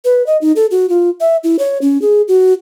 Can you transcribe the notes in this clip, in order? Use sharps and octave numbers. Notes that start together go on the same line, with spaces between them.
B4
D#5
D#4
A4
F#4
F4
E5
E4
C#5
C#4
G#4
F#4